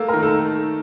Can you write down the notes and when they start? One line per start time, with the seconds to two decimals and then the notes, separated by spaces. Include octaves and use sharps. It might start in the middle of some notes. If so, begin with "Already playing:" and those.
Already playing: A3 A#3 A4
0.08 A#4
0.13 D#3
0.23 A4